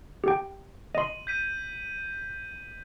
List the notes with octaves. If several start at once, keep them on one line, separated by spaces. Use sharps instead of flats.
G4 G5
D#5 C6 D#7 F#7
G6 B6 D#7